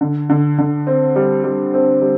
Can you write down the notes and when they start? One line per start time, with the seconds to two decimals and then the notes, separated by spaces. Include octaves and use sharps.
0.01 D3
0.30 D3
0.58 D3
0.87 C4
1.16 G3
1.44 G3
1.74 C4
2.02 G3